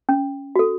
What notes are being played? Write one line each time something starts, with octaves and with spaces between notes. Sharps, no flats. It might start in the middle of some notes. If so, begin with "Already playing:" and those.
C#4
F#4 A4